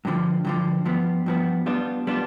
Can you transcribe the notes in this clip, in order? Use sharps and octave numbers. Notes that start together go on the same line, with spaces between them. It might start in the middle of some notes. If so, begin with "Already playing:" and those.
G2 D3 F3
G2 D3 F3
G2 F3 B3
G2 F3 B3
G3 B3 D4 F4
G3 B3 D4 F4